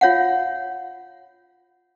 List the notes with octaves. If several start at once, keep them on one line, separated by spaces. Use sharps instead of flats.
F4 C#5 F5 F#5